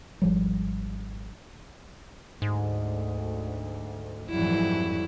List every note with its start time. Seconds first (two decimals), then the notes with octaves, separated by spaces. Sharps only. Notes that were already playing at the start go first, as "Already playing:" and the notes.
0.22 G#1 F3 G3
2.42 D2 G#2
4.29 F2 G#2 E3 F#3 G3 E4